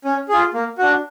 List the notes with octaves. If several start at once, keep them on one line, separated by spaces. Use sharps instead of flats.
C#4
F4 G#4
A#3
D4 F#4